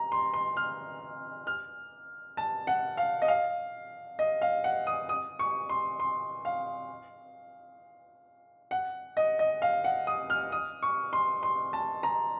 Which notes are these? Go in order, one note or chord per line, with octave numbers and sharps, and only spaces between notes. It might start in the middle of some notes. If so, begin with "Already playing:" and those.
Already playing: A#5
C6
C6
F6
F6
A5
F#5
F5
D#5
F5
D#5
F5
F#5
D#6
D#6
C#6
C6
C6
F5
F#5
D#5
D#5
F5
F#5
D#6
F6
D#6
C#6
C6
C6
A5
A#5